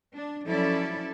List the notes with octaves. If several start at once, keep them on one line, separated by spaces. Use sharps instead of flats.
D4
F3 F#3 C#4 E4 A4 D5